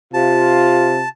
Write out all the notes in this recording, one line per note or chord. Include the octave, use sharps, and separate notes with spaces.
C3 F4 A5